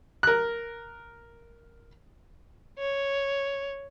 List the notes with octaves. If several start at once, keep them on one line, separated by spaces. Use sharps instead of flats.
A#4 F#6
C#5